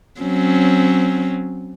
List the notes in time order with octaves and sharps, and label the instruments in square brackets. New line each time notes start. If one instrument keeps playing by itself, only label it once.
[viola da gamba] F#3 C4 C#4